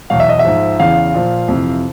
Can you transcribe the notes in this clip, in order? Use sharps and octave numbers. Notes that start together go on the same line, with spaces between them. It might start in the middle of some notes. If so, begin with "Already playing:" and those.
E2 B2 F#3 F5
E5
D#5
E5
G#2 F3
E2 C#3 E3 F5
A#2 F3
F2 C3 E3